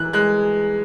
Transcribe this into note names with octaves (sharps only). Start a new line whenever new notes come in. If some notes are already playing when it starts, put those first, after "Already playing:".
Already playing: E3 F#6
G#3 F#6